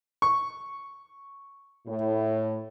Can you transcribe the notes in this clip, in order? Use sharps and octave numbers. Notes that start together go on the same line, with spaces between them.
C#6
A2